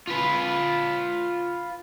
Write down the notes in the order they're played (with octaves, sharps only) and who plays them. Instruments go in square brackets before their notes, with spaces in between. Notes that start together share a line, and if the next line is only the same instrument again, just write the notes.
[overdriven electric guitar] F4 B4